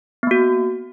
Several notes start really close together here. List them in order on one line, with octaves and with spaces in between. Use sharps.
B3 A#3 F#4